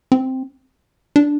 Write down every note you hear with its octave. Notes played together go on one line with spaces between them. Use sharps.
C4
D4